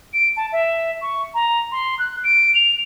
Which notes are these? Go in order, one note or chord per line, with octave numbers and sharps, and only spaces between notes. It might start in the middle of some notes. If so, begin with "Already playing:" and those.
D7
A5
E5
C#6
A#5
C6
F#6
D7
F7